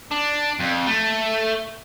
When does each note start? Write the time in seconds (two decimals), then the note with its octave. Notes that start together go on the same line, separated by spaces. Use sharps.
0.11 D4
0.59 F2
0.87 A3